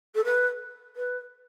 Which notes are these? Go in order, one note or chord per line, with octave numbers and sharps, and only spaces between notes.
A4
B4
B4